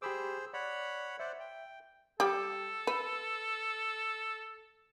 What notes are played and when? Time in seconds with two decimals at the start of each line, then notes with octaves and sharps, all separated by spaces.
0.02 G4 G#4 C5 B5 D6 E6
0.54 C#5 D5 F#5 B5
1.20 C5 D5 E5 F#5
1.40 G5
2.20 G3 G4 A4
2.87 B4